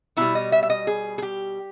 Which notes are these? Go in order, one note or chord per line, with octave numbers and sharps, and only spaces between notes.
B2 G3 E4
D#5
E5
E5
D#5
G#4
G#4
G4